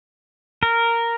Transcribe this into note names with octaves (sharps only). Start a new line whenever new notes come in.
A#4